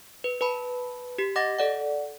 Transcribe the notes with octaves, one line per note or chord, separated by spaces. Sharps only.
B4
B4 A5 B5
G4 B6
D#5 F#5 D6 A6 A#6
A4 D5 F#5